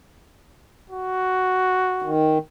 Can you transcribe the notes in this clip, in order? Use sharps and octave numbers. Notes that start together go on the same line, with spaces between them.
F#4
D#3